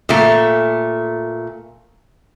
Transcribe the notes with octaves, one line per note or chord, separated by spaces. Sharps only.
A#2 A3